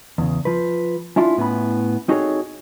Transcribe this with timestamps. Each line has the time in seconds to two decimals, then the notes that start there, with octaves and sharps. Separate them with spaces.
0.18 E2 C#3
0.45 F3 B4
1.16 C#4 D4 E4 F4
1.38 A2 B3 C#4 B5
2.08 C4 D#4 F#4 G#4 A4 C#5